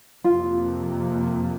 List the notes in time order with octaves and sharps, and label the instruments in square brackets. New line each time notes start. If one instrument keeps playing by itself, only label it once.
[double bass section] F2 C3 F3 A#3 [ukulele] F4